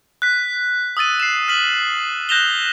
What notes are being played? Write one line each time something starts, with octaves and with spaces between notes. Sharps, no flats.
F#6 B6
D#6 E6 A6 D#7
C7 E7
F6 B6 F#7
F#6 G6 A#6 E7 F7 G7